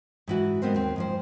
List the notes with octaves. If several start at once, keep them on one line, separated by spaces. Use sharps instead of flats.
G#2 E3 F#4
G#3 B3 C4 A#4 C5
D#2 C4
G#2 F3 C5